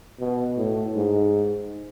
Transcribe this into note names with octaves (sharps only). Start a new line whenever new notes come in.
B2
A2
G#2